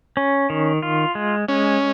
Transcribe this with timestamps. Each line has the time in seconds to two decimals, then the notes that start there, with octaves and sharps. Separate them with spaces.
0.17 C#4
0.50 D#3
0.83 F4
1.15 G#3
1.48 G#3 C#4